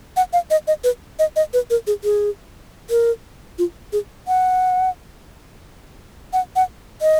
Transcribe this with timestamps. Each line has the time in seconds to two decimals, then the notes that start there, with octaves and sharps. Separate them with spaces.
0.17 F#5
0.33 F5
0.51 D#5
0.67 D#5
0.84 B4
1.19 D#5
1.36 D#5
1.54 B4
1.70 A#4
1.87 G#4
2.04 G#4
2.90 A#4
3.59 F4
3.93 G#4
4.28 F#5
6.33 F#5
6.56 F#5
7.02 D#5